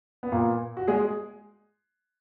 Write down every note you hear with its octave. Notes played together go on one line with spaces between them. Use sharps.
B3
A#2 A#3
F#4
G#3 G#4